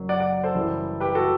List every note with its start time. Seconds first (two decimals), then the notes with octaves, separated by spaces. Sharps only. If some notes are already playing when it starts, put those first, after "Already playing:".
Already playing: F#1 F#2 F#3
0.09 D5 F#5
0.20 D5 F#5
0.43 A4 C5
0.55 F#1 F#2 E3 G3
1.00 G4 B4
1.15 F#4 A4